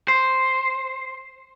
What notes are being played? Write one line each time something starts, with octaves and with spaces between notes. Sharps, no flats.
C5